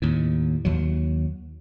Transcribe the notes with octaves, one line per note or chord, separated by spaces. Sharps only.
D#2 A2
D#2 F#3